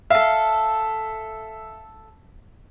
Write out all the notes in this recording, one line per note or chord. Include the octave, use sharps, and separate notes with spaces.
A4 E5 F5